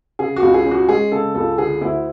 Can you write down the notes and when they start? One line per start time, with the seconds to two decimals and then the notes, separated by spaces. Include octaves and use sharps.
0.19 C#3 G#4
0.36 F#4
0.42 C#2
0.54 G#4
0.66 C#4
0.71 F#4
0.88 G#3 G#4
1.12 C#3 A4
1.35 C#2 A4
1.58 D3 G#4
1.81 D2 E4